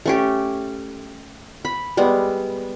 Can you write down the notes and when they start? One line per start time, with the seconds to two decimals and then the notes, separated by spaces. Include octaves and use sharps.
0.06 A3 C#4 G4
1.65 B5
1.97 G3 G#3 B3